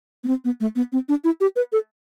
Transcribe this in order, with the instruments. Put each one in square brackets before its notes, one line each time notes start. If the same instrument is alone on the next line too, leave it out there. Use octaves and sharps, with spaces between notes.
[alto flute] B3
C4
B3
A3
B3
C4
D4
E4
G4
B4
A4